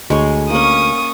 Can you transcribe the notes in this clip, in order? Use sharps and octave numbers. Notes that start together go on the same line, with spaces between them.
D2 G#3 C#5
A#3 C#4 C#6 D#6 D#7